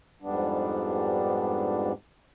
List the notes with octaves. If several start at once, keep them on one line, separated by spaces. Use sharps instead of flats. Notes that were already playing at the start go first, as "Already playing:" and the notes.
F2 G#2 G3 B3 D4